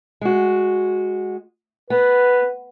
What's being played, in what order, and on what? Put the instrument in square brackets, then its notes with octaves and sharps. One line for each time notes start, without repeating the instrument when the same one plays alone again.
[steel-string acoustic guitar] G#3 F#4
[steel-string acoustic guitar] B3 [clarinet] B4